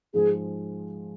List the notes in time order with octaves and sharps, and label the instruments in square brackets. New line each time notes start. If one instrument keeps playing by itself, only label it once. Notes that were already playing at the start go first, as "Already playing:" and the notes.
[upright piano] G#2 F3 G#3 [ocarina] G#4